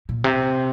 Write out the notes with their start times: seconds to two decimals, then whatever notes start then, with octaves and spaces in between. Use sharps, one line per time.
0.09 A#2
0.24 C3